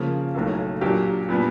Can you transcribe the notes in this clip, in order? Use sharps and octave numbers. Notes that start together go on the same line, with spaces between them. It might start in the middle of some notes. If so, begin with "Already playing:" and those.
Already playing: C#3 F3 A#3 C#4
B1 A2 F#3 A#3
A#2 F#3 A#3 D4 G4
A#2 G3 B3 D4